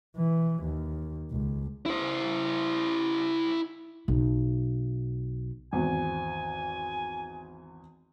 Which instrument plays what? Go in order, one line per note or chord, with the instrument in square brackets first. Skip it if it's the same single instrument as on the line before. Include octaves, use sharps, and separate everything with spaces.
[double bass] E3
D#2
C#2
[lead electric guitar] E4 C5
[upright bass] B1
[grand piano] G#1 E2 [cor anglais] G#5